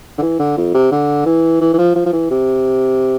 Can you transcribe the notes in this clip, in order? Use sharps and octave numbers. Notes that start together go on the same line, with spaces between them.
D3
E3
D3
F2
C3
D3
E3
E3
E3
F3
F3
F3
E3
C3